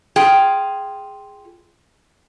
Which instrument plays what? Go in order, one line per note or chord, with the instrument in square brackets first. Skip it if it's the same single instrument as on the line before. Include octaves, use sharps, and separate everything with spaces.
[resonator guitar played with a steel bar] F4 G#4 G5